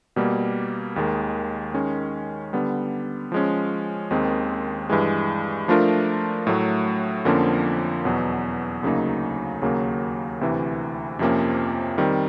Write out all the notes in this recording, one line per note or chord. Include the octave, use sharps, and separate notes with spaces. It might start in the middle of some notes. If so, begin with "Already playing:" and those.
B2 G3 A#3
D#2 D#3 G#3
D#3 G#3 C#4
D3 G3 B3
F3 G#3 C#4
D#2 D#3 G#3 C4
G2 E3 G#3
F3 A3 D4 F4 A#4
A2 F#3 A3
F2 D3 F3 A#3 C#4
E2 B2 F#3
D2 C#3 F#3 A#3 D#4
D#2 C#3 F#3 A#3
D2 C3 E3
F2 C3 F3 A#3 C#4
D#3 G3 C4